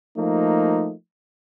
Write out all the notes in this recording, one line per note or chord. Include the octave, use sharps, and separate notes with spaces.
F3 A3 A#3 D#4